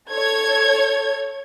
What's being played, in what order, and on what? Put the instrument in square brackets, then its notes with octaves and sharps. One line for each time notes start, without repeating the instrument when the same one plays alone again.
[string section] A4 C#5 G#6